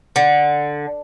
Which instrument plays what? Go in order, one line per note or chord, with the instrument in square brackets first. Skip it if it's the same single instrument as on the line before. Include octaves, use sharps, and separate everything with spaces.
[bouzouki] D3